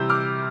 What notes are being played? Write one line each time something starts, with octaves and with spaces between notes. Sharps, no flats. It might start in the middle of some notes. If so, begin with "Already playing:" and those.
Already playing: C3 E3 G3 E6 G6
D6 F6